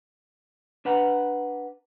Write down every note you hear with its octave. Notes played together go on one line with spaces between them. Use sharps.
D4 B4 F#5 A#5